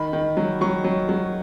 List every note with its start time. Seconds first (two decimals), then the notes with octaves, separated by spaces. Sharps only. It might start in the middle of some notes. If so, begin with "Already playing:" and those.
Already playing: D#3 B5
0.13 D#3
0.37 F#3
0.61 F#3 C#6
0.84 F#3
1.09 F#3